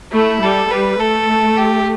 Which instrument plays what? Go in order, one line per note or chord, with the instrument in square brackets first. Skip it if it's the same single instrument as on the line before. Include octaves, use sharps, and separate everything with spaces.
[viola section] A3 [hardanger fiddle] E4
[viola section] G3 [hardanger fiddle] A4
[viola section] G3 [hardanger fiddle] B4
[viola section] A3 [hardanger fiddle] A4
[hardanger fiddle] G4